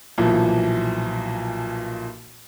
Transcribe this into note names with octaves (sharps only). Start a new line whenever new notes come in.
B1 A#2 E3 F3